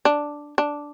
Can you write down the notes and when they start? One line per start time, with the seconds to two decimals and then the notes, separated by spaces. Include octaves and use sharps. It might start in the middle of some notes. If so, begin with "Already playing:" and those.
0.05 D4
0.58 D4